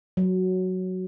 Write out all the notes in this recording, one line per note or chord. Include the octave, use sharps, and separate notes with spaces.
F#3